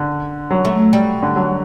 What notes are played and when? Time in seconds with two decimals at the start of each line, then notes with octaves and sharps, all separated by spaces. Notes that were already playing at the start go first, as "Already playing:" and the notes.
Already playing: D3
0.51 F#3
0.65 A3
0.93 G3
1.22 D3
1.36 F#3